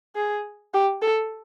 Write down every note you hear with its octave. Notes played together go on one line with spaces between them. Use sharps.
G#4
G4
A4